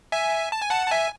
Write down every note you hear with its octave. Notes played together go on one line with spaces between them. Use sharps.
E5 G#5
A5
G#5
F#5 A5
A5
E5 G#5